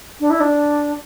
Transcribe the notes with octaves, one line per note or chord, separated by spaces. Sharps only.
D4
E4
D4